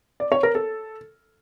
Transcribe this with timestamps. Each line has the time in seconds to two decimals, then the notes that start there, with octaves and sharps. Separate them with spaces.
0.20 D5
0.32 C#5
0.43 A#4
0.55 A4